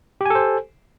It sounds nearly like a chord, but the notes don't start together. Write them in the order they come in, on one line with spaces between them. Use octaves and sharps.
G4 G#5 A4 C5